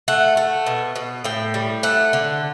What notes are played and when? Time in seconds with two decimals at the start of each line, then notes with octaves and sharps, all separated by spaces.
0.08 A3 F#5
0.37 A3
0.66 B2
0.96 B2
1.24 A2 G5
1.54 G3
1.83 A3 F#5
2.13 D3